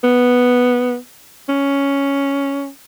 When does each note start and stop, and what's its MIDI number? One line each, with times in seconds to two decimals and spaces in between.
0.04 0.96 59
1.49 2.68 61